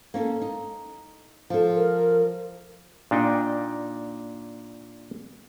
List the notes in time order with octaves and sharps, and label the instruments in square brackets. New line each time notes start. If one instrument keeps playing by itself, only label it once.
[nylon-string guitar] A#3 C#4 A4
D#4
F3 A4
[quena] A#4
[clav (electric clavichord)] A#2 D4 D#4 G5